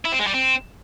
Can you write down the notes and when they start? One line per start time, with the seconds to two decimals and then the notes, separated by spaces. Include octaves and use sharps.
0.05 E4
0.12 C4
0.20 G#3
0.27 G3
0.34 C4